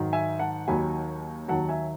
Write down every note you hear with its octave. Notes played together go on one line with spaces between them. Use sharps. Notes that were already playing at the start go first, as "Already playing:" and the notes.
Already playing: G#2 D#3 F#3
E5 G#5
F#5 A5
D#2 D#3 F#3 G#5 B5
D#2 D#3 F#3 F#5 A5
E5 G#5